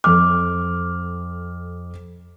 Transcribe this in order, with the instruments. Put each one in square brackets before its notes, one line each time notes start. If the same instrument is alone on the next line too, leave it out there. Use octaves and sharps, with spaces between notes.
[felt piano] F2 A4 F6 [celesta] D6